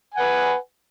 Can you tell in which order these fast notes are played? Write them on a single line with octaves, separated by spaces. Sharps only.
G#5 F#5 B4